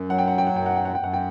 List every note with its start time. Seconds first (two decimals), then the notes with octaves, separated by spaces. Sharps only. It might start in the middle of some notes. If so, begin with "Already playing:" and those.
Already playing: F#2
0.09 F#3 F#5
0.18 G5
0.28 F#5
0.38 G5
0.47 F#5
0.54 F#2 G5
0.66 F#5
0.76 G5
0.85 F#5
0.95 G5
1.00 F#2 F#5
1.13 G5